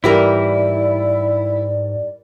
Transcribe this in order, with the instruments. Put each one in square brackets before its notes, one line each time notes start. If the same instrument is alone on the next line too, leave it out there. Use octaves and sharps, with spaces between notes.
[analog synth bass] G#2 [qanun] E3 G3 A#4 [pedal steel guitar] E4 [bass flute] D5